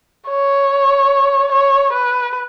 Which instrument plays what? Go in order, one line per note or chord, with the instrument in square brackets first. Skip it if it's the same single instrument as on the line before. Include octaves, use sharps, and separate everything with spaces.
[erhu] C#5
C#5
B4